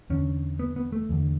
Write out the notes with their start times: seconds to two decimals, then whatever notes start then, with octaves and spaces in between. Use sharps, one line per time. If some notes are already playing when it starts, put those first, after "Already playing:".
0.10 E2 D3 C#4
0.59 B3
0.76 B3
0.92 A3
1.09 E2 D3